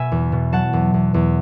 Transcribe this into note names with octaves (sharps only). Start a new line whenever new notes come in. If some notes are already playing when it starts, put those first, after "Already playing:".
Already playing: B2 E5 G#5
E2
B2
F#3 F#5 A5
E2
E2
E2